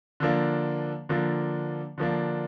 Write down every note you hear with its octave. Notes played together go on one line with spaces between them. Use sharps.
D3 F3 A#3 D4
D3 F3 A#3 D4
D3 F3 A#3 D4